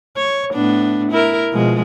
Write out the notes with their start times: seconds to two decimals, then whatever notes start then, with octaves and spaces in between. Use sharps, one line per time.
0.16 C#5
0.53 A2 B3 D4
1.11 E4 A#4
1.53 B2 F3 G#3